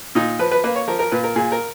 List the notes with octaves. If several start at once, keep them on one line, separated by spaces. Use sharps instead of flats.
A#2 D#4
F3 B4
B4
A#3 B4
C#5
F3 A#4
A#4
A#2 B4
A#4
A#2 G#4
A#4